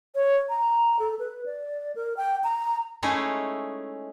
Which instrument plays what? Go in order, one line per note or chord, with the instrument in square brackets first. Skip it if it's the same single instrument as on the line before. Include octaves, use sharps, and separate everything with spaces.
[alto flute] C#5
A#5
A4
B4
D5
A#4
G5
A#5
[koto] G#3 A3 C#4 D#4 E4